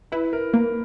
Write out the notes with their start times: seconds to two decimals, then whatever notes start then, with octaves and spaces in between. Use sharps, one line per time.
0.12 E4 B4
0.33 A#4
0.53 A#3 A#4